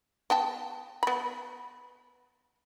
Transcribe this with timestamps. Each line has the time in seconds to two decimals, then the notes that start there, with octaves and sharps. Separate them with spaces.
0.30 B3 G5 A5
1.03 B3 B5